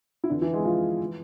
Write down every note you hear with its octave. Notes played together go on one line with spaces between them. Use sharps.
E4
F2 D3 E3 D4
E3 E4
G#3 G#4
F3 F4
E3